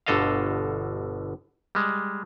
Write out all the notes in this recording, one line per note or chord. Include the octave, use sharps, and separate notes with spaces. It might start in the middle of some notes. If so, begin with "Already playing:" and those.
G1 B2 D3 A4 D#5 F5
G3 G#3